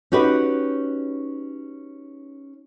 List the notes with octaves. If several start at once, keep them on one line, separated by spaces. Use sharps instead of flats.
C#4 D#4 F#4 G4 B4